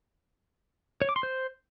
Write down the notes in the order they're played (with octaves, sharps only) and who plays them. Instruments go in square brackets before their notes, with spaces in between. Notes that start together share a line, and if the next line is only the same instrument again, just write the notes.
[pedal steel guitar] C#5
D6
C6
C5